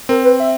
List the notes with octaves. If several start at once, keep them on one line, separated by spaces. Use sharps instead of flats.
C4 A#4
B4
E5